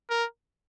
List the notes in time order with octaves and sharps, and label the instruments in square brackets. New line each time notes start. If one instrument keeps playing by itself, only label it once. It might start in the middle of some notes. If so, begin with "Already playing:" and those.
[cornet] A#4